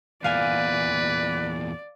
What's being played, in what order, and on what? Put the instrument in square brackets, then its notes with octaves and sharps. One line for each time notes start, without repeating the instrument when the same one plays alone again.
[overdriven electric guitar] E2 A#2 [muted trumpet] B4 [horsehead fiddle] D5 [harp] F5 G#5